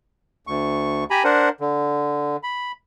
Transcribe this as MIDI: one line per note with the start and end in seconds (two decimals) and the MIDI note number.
0.47 1.04 38
0.47 1.04 85
1.10 1.23 67
1.10 1.23 80
1.10 1.23 82
1.10 1.23 83
1.24 1.49 62
1.24 1.49 70
1.24 1.49 72
1.24 1.49 78
1.60 2.36 50
2.43 2.72 83